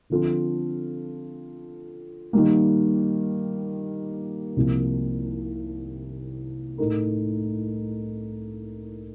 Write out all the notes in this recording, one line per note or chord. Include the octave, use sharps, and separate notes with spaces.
D3 F3 C4 F4 A4
D#3 G3 A#3
C2 C3 F3 A#3
A2 A3 D#4 A#4